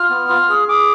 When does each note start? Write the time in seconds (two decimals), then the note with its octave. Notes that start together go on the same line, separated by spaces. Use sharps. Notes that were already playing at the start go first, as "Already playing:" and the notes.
Already playing: F4 F6
0.10 B3
0.29 F4
0.49 G#4
0.68 G#4 D6